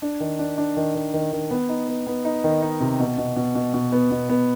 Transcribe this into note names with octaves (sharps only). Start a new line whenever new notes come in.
D4
D#3
D4
D4
D#3
D#3
D#3
D#3
B3
D#4
B3
B3
D#4
D#3
D#4
C3
B2
B2
B2
B2
B2
B3
B2
B3